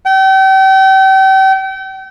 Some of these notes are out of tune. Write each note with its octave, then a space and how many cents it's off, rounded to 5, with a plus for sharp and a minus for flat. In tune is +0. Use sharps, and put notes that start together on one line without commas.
G5 -35